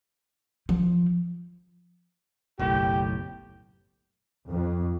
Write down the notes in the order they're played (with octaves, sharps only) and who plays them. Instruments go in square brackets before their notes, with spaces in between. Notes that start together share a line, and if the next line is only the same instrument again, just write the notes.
[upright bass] F3
[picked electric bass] F#1 B1 A2 [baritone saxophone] G4
[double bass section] F2